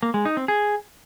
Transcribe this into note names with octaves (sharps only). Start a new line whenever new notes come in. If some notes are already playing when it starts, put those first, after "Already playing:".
A#3
G#3
D#4
C4
G#4